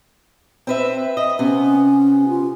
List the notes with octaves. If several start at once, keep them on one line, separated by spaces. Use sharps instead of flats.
C4 B4 E5
D#5
C3 B3 C#4
F4